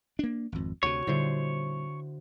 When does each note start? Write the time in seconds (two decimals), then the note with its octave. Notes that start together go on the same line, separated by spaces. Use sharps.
0.19 A#3 D4
0.52 G#1 F2
0.83 D2 C3 F#4 C#5
1.07 A#2 D3 G3 E4 C5